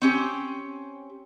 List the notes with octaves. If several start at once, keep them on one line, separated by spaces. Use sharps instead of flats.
C4 C#4 G4